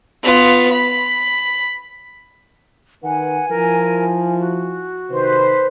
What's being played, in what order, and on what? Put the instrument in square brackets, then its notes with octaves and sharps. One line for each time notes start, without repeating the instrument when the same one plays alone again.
[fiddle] B3 F4
B5
[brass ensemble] D#3 B4 [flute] F#5 [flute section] G#5
[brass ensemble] F3 E4 [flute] A#4
[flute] F#4
[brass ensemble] C3 D#3 [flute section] B4 C5